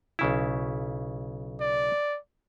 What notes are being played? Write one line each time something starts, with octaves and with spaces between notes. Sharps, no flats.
B1 C#3 E4
D5